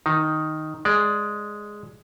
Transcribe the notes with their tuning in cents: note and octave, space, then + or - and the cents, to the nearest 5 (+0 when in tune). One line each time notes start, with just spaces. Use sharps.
D#3 +0 D#4 +0
G#3 +0 D5 +0